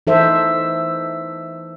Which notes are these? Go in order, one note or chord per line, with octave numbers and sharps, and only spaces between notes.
E3 D#4 A4 C5 E5